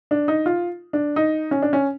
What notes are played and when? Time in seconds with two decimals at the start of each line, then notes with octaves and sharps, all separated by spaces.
0.11 D4
0.28 D#4
0.46 F4
0.93 D4
1.16 D#4
1.51 C#4
1.62 D4
1.73 C#4